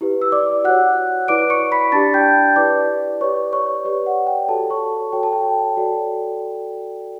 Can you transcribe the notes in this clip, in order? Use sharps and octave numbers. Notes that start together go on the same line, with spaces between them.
E4 G4 B4
E6
D5 D6
F#4 C#5 F#5 F#6
E4 B4 D5 D6 D7
C#6 C#7
B5 B6
D4 G4 D5 A5 A6
G5 G6
E4 G4 B4 D5 D6
G4 B4 C#5 D5 C#6
C#5 C#6
G4 B4 D5
F#5
G5
F#4 A4 C#5 A5
C#5 C#6
F#4 A4 C#5 G5
A5
G5
F#4 A4 D5